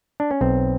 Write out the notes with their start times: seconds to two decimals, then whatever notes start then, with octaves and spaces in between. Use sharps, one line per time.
0.20 D4
0.31 C#4
0.41 B1 C4